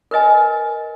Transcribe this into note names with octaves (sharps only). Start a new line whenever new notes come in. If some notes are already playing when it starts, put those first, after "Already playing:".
A#4 B4 D#5 G#5